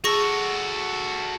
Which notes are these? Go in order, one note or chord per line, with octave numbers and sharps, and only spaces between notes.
F#4 G#4 A4 C#6 A#6